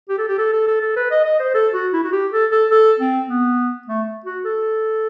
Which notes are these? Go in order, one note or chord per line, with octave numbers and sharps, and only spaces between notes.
G4
A4
G4
A4
A4
A4
A4
B4
D#5
D#5
C5
A4
F#4
E4
F#4
G4
A4
A4
A4
C4
B3
A3
F#4
A4